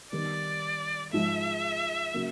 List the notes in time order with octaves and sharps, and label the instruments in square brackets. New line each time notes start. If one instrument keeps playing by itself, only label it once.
[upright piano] D#3 G3 B3 [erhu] D5
[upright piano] G#2 F3 G#3 [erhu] E5
[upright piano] C#3 F#3 A#3